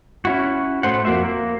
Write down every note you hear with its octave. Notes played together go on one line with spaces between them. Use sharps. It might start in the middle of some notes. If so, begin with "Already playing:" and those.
C#4 E4 F#4
A2 A3 C5 F#5
F2 A#3 F#4 C5 E5
A#3